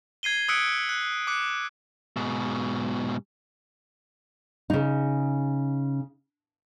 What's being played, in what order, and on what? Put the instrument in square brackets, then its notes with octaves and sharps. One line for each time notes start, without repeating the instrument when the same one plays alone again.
[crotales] G#6 C7 D#7 G7
D#6 E6 F#6 B6 C#7 D7
F#6
D6 F#6 C#7
[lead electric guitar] G#2 B2
[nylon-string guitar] C#3 D#4